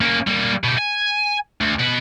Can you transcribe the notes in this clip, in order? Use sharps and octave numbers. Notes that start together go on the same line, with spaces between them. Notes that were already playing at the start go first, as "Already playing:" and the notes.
A#3 C#4
G3 A#3
B2 G4
G#5
D2
B2 B4